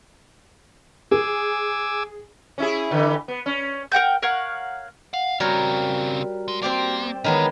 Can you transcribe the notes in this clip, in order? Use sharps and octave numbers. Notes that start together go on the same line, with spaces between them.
G#4 G#5 D6 E6
C#4 E4 G#4
D3 E3
B3
C#4
A#4 F#5 G5 G6
A#4 C#5 F5 F#5
F5 F#5
C#3 G3 C4 F#4 A#4 C#5
G#3
A#3 C4 G4 D5
D#3 E3 G#3 B3 C#5 A#5